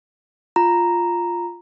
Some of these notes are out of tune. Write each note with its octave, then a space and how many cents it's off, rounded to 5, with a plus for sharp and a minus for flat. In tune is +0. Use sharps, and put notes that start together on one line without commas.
F4 +0 A#5 +0